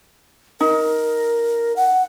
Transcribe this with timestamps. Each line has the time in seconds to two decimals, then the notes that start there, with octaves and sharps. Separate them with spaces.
0.61 D#4 A#4
1.76 F#5